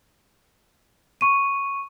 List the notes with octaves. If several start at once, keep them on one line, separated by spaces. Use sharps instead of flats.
C#6 D#7